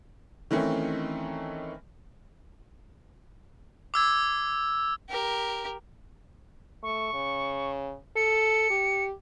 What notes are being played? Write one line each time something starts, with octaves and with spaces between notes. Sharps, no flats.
D#3 E3 A3 C4 C#4 D#4
D6 E6 G#6
G4 A#4
A3 C#6
C#3
A4 C#7
G4